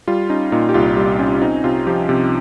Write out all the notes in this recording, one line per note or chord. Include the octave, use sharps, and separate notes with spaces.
G3 F4
C#4 D#4
A#2 D#4
G4
C2 F4
G3
C#4
C4 D#4
C3 F4
F3 G4
C3